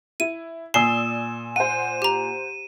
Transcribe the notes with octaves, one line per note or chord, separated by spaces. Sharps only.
E4 D#7
A#2 D5 G#5 D#6 E6 C7 E7 G7
C5 F#5 D#7
G4 A#5